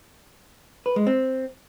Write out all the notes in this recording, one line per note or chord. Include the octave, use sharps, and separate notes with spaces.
B4
G#3
C4